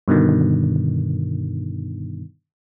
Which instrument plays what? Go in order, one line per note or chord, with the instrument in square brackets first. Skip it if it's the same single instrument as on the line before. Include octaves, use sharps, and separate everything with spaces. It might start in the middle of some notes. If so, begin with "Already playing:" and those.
[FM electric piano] G2 B2 D3 D#3